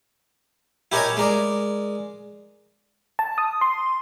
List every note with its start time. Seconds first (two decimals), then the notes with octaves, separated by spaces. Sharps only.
0.92 E4 G4 A#4 C#5 D#5 G#5
1.17 G#3 A#4 D5
3.19 A5
3.38 D#6
3.61 C6